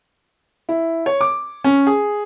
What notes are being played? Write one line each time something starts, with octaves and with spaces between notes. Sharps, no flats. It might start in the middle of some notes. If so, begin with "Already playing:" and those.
E4
C#5
D6
C#4
G#4